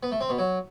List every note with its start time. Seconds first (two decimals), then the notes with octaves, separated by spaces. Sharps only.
0.03 B3
0.12 A3
0.21 C4
0.30 B2
0.39 F#3